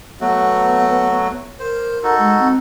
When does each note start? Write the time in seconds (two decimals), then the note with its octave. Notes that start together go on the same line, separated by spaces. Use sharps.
0.21 F#3 A3 B3 F#4
1.59 A#4 C5
2.03 D#4 F#4 A4
2.19 G#3
2.39 C4